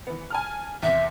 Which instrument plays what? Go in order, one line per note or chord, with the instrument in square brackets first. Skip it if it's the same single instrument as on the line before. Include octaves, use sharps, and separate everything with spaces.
[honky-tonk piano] E3 B3
G#5 A5 F6
[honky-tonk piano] E2 C3 [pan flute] E5